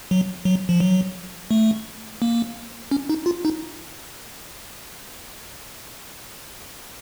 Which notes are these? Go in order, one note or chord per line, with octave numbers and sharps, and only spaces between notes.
F#3
F#3
F3
F#3
A3
A#3
C#4
D#4
F4
D#4